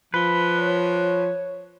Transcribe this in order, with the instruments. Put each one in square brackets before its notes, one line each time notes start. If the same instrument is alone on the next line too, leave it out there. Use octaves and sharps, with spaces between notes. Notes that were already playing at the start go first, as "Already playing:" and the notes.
[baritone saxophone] F3 [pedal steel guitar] B4
[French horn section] C#5